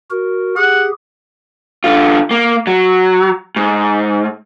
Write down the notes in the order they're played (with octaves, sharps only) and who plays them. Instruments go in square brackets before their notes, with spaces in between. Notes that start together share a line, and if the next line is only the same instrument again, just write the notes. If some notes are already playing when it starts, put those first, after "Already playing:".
[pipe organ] F#4 A#4
[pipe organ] G4 G#4 [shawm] F#5
[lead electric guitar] D3 F4
A#3
F#3
G#2